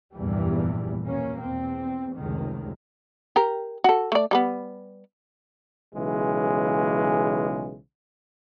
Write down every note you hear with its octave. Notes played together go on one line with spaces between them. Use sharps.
F1 E2 G2 A#2 E3 G3
B2 A#3 C#4
E2 C4
F1 C#2 D#3
G4 A#4
F#4 A4
A3 D5
G3 A#3 B3
B1 C#3 E3 G#3